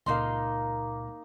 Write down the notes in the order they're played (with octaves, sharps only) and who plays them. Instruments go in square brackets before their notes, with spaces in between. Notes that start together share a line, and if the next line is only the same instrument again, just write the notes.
[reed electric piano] C#2 A#2 F5 [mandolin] A#3 D#4 C6